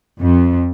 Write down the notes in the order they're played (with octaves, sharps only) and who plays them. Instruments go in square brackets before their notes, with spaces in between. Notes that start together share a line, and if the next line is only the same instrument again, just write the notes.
[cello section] F2